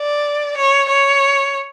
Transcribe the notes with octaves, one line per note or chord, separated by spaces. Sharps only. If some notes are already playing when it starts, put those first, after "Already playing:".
Already playing: D5
C#5
C#5